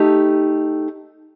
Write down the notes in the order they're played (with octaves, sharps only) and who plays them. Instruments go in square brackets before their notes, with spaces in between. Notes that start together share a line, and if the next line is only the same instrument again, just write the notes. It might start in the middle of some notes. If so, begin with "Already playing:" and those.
Already playing: [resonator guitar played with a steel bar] A3 D#4 G4